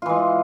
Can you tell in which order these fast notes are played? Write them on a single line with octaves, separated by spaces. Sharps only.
F4 E3 G#3